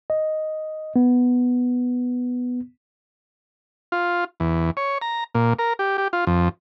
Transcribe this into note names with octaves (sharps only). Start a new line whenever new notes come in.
D#5
B3
F4
E2
C#5
A#5
A#2
A#4
G4
G4
F4
F2